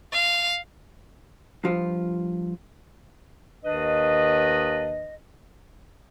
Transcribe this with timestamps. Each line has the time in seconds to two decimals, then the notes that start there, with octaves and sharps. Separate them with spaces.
0.13 F5
1.64 G2 F3 F4
3.64 D#2 D#3 D4 B4 D#5